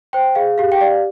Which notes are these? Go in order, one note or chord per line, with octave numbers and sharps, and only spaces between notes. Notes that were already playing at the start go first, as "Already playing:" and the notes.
C5 G5
G#4 F5
G4 F5
G5
D5 F5